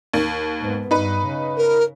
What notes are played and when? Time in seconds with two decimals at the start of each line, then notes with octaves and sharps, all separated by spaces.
0.14 D#2
0.61 G#2 B3
0.91 G2 D#4 B4
1.27 C#3
1.57 A#4